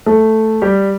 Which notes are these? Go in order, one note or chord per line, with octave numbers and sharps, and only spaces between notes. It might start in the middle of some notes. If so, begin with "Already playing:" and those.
A3 A4
G3 G4